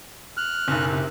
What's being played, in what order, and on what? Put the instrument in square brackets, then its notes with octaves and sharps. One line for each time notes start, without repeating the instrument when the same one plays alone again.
[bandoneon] F6 F#6
[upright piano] F#1 B1
[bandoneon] C3